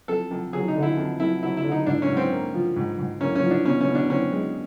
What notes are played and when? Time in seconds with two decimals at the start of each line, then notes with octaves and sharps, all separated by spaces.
0.08 F2 A4
0.31 F2
0.53 F#3 G#4
0.68 D#4
0.76 D3
0.83 E4
0.97 F2
1.20 F2 E4
1.42 F#3 E4
1.57 E4
1.64 D3
1.72 D#4
1.87 G#2 D4
2.02 C#4
2.09 G#2
2.17 C4
2.32 A#3
2.54 F3
2.76 G#2
2.99 G#2
3.21 A#3 C#4
3.35 C#4
3.43 F3
3.51 D4
3.65 B2 C#4
3.81 C#4
3.88 B2
3.95 D4
4.10 C4 C#4
4.33 G#3